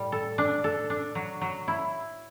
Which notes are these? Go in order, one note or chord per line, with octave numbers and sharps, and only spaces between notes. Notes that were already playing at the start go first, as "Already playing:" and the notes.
Already playing: A2 G3
A4
D4
A4
D4
F#3
F#3
E4